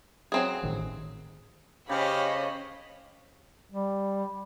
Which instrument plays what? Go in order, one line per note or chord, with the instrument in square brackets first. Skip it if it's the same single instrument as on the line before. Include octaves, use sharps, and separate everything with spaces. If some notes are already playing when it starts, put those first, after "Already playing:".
[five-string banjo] F#3 C4 G#4
[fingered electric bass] A1 D#3
[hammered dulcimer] C#3 C#6 [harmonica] G4 F5 [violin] C5 D#5 [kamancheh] C#5 B5
[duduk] G3